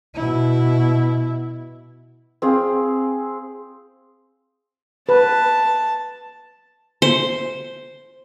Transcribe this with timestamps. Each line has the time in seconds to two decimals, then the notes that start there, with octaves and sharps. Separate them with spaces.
0.14 B2 E4
2.42 C4 G#4 F5
5.09 B4 A5
7.02 C5